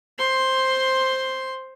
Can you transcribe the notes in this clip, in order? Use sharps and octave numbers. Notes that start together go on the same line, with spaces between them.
C5 C6